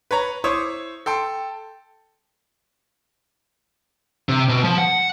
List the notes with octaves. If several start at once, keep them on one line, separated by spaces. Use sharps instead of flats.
B4 C#5 A#5
E4 C5 C#5 D6 D#6
A4 G5 C6
C3
B2
F3
F#5